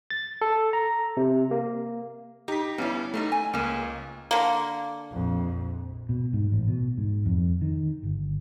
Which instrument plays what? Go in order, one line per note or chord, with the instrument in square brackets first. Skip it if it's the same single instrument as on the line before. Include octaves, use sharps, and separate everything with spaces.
[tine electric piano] A6
A4
A#5
C3
A#3
[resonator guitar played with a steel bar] D#4 [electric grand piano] G4 B6
[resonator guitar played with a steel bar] G2 G3 [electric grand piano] B3 C#4 E4
[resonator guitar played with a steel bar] F#2 G3 D#4 [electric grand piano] A3
[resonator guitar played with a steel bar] G#5
[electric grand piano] C#2 A#3 [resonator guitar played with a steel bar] G#3 C#4
[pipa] D3 A#3
[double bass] A#1 F2
[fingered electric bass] B2
G#2
A1
B2
G#2
F2
D#3
G1